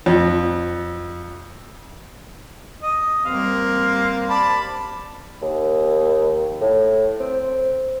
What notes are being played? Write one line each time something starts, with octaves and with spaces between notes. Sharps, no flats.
F2
D#5
G3 A#3 C4 F5
D5 A5 B5
D#2
A2
C4